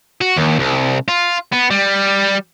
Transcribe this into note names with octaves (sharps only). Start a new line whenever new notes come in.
F#4
D#2
C2
F4
B3
G3